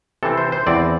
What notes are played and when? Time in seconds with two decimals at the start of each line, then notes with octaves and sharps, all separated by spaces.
0.23 C3 E3 C4 A4
0.38 C5
0.52 C5
0.66 E2 E3 C4 D5